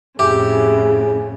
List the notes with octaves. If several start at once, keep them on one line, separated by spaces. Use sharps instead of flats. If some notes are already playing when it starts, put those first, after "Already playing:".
F2 A2 C#3 E4 G4 G#4